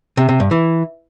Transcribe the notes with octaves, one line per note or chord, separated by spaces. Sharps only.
C3
C3
G2
E3